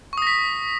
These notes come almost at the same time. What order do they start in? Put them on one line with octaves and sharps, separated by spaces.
C#6 D#6 A#6 B6